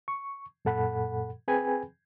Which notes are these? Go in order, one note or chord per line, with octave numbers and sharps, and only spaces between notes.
C#6
F#2 A#2 A4 F#5 B5
C4 G#4 B4 G5 G#5 B5